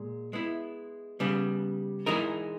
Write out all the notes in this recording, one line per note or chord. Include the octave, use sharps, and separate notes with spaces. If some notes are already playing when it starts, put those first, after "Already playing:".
Already playing: A#2 G#3
G#3 B3 E4
C#3 G3 B3
E3 G#3 D#4 A#4